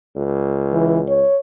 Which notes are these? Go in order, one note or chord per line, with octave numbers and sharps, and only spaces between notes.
C#2
E3
C#5